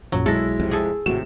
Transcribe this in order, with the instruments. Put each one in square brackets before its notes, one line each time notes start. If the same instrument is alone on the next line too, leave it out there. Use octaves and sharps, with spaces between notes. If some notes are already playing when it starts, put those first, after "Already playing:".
[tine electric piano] A#1 F#2 A#2 [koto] F#3
[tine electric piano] B1 A#6 [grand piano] G#3 E4 [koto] A4
[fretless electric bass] F2 C3
[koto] G#4 A4
[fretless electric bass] G#1 A2 C3 [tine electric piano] F#4 [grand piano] E7